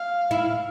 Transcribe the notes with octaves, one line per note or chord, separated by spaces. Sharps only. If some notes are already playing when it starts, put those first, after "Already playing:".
Already playing: F5
E4